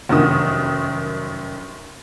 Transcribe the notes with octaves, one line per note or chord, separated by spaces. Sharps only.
F1 F#2 D#3 D#6